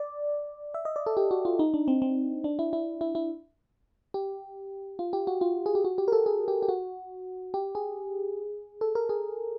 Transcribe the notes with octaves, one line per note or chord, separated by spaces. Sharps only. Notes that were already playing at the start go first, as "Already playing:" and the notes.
Already playing: D5
E5
D#5
D5
A4
G4
F#4
F4
D#4
D4
C4
C4
D4
E4
E4
E4
E4
G4
F4
G4
F#4
F4
G#4
G4
F#4
G4
A#4
A4
G#4
G4
G4
F#4
G4
G#4
A4
A#4
G#4